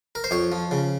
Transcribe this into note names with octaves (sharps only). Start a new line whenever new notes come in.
A#4
C5
F2 C#5
F3
C#3